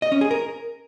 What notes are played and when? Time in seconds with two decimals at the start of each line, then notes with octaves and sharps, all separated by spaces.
0.02 D#5
0.12 C#4
0.21 G#4
0.31 A#4